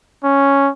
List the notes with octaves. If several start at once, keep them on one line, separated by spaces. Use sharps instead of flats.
C#4